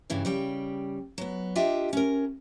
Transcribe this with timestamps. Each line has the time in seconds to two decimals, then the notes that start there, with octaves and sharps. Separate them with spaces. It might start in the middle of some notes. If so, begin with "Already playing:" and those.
0.10 G2 C#3 E3 G3
0.25 C#3 G3 G5
1.18 F#3 B3
1.55 D4 F4 G4 D#5 E5 G5
1.93 C#4 A#4